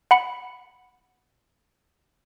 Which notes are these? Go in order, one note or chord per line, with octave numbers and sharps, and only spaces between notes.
F#5 B5 C#7